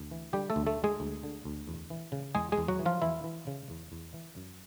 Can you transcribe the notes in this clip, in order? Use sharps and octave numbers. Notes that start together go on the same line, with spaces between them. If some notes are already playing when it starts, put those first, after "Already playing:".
Already playing: D2
E3
D3 G3 G4
A3 A4
D2
A3 A4
D3
G#3 G#4
D2
D3
D2
E2
E3
C#3
E2 G#3 G#4
G#3 G#4
E2
F#3 F#4
E3
F3 F4
E2 E3 E4
E3
C#3
E2
E2
E3
F#2